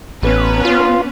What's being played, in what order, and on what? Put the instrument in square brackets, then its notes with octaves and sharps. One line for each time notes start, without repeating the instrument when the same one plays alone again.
[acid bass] A1 [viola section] B3 C#4 B4
[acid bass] F4